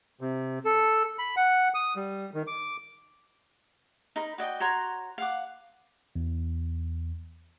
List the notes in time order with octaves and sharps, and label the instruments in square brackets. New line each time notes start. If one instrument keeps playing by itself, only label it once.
[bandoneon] C3
A4
B5
F#5
D#6
G3
D#3
D6
[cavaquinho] D#4 A#4 B5
F#4 D5 D#5 G5
F#4 C#5 A#5 C6
F5 F#5 D6
[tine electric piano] E2